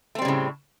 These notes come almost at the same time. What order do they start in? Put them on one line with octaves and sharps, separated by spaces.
A3 C4 G3 C#3 A2